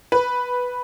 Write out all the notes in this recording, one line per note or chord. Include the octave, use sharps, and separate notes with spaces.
B4